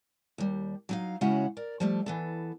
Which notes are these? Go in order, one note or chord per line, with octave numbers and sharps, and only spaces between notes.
D#2 G3
F#3 D#4 F5
C#3 G#3 C#4 E4 F#4 F#5
A#4 D5
F3 G3 A3
E3 B3 A4